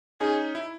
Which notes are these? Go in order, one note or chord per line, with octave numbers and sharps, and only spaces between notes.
C#4 D#4 G#4
E4